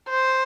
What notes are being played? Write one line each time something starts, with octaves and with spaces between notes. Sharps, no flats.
C5